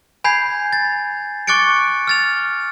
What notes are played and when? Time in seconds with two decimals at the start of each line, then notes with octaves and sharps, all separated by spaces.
0.24 G#5 B5 G6 G#6 C7
0.73 A6
1.47 C#6 D6 F#6 A6 C#7 D7
2.07 F6 A6 F7